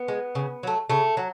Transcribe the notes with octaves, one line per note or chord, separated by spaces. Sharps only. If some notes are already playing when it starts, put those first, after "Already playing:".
Already playing: B3
G#3
C#3
F#3 A3
C#3 A3
F#3